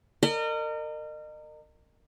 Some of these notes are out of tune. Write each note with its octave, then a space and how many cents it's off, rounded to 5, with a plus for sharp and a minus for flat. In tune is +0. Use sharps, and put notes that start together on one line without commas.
A#4 -30 D#5 -35